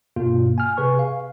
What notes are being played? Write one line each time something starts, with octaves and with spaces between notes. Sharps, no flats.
G2 B2 A#3 F4
G#5 F6
C3 G#4 B4 G#5 C#6
F5